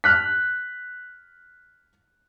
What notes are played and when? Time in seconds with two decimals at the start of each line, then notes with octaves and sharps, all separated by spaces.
0.04 F6 F#6 B6